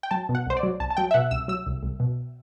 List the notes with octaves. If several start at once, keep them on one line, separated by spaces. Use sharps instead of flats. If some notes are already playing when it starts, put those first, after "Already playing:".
G5
F#3 A5
B2
F#5
C2 C5
D5
F#3
C2 A5
A5
F#3 G5
E5
B2 F#5
C2 E6
F#3 E6
C2
C2
B2